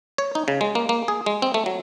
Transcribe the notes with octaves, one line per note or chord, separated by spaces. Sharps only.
C#5
D#4
C#3
G#3
A#3
A#3
G#4
G#3
C4
A3
F#3